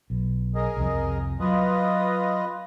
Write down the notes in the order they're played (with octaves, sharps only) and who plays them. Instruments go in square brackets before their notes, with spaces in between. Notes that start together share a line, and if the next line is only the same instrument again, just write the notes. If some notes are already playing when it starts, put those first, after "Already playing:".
[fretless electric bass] B1
[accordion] G#4 A#4 D#5
[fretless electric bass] C2 F2
[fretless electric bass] F#3 [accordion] F4 B4 D#5